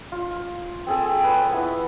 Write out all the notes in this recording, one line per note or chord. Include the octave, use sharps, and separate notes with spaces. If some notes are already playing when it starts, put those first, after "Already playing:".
F4
C4 G#4 A4
B4 C#5
B3 E4